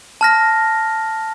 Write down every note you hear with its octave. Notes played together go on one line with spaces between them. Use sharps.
A5 F6 A#6